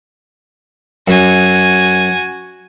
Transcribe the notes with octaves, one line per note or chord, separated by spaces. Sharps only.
F#2 F#4 G#5